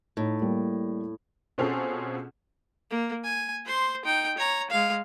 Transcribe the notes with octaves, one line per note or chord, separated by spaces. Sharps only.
A2 D#4
G3 A#3
B2 C4 C#4 F4 G#4 A4
A#3
G#5
C5 C6
D#4 G5
C#5 A#5
G#3 F5